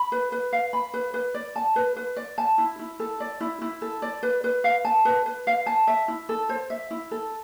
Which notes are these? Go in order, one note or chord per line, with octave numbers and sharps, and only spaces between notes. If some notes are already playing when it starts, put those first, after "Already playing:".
Already playing: B5
B4
B4
F5
B5
B4
B4
D5
A5
B4
B4
D5
A5
E4
E4
A4
D5
E4
E4
A4
D5
B4
B4
F5
A5
B4
B4
F5
A5
E5
E4
A4
C5
E5
E4
A4